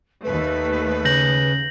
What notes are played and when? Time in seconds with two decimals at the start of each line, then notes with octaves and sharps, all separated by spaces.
0.24 D#2 A3 B4
1.05 C#3 G6 A#6 F#7